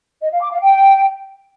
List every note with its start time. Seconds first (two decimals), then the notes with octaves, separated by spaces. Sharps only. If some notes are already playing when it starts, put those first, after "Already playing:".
0.21 D#5
0.31 F5
0.41 D6
0.50 F5
0.60 G5